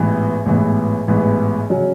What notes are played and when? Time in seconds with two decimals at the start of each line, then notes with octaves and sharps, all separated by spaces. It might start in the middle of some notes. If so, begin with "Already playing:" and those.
Already playing: A1 G#2 E3 B3
0.46 A1 G#2 E3 B3
1.08 A1 G#2 E3 B3
1.70 C#3 F#3 C#4